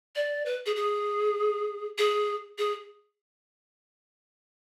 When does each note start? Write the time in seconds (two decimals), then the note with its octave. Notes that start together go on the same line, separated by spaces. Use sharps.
0.16 D5
0.46 B4
0.66 G#4
0.76 G#4
1.98 G#4
2.58 G#4